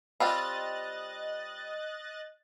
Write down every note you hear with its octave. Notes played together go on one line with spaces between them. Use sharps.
G3 C4 F4 D#5 F#6 A6